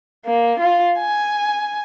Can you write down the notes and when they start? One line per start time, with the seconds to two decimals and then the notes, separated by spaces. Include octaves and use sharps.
0.26 A#3
0.59 F4
0.98 G#5